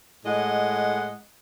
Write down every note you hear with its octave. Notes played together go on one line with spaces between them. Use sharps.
A2 G#3 D#5 F#5